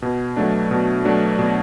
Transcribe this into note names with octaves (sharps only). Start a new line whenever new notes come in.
B2
F#3 A3 D4
B2
F#3 A3 D4
B2